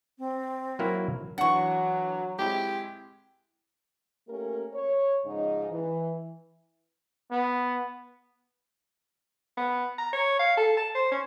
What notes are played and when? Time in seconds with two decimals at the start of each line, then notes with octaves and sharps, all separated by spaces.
0.18 C4
0.79 F#3 A#3 E4
1.38 E3 F#3 D4 F#5 C#6
2.39 G#3 C4 E4 G4
4.27 A3 A#3 C#4 G4 A#4
4.74 C#5
5.26 G#2 C#3 F3 D#4 D#5
5.71 E3
7.31 B3
9.57 B3
9.98 A#5
10.13 C#5
10.39 F5
10.57 A4
10.77 A5
10.95 C5
11.12 C#4